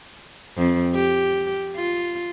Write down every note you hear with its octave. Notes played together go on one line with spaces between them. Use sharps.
F2
G4
F4